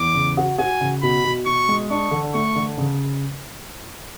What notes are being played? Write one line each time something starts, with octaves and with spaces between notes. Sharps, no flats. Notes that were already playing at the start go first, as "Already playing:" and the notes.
Already playing: E2 D6
C#3
F#4
F#4 G#5
C#3
B2 B5
B2
B2 C#6
G#3
D4 C#6
D3
A3 C#6
D3
C#3